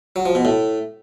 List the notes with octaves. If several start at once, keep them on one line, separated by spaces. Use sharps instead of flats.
F#3
F3
B2
A2